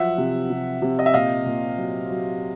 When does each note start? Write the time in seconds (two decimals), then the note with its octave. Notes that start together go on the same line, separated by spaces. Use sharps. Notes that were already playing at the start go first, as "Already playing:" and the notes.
Already playing: F3 F#3 E5 F#5
0.18 C3
0.50 C3
0.82 C3
0.99 D#5
1.06 E5
1.14 A#2 D#5 F5
1.46 A#2
1.77 F#3
2.10 F#3